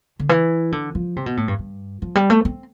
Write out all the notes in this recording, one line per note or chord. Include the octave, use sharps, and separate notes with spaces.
D3
E3
D3
F3
C3
B2
A2
G2
G2
F3
G3
A3
C4